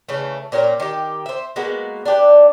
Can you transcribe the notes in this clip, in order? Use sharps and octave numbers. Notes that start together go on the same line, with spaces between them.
C#3 E3 A3
A#2 C#4 G4 A#4
D#3 G4
C5 E5
G#3 A#3 B3 F#4
D4 G4 B4